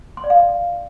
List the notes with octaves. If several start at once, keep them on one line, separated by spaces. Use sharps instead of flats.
C6
D5
F5